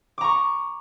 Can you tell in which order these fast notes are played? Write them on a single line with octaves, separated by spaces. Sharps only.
D6 A#5 C#6